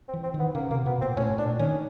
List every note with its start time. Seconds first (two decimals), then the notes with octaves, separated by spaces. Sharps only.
0.08 C4
0.13 E3
0.23 C4
0.34 D#3
0.39 B3
0.55 C#3 A#3
0.71 C3 A#3
0.86 B2 B3
1.01 A#2 C4
1.17 A2 C#4
1.38 A#2 D4
1.59 D#3 C#4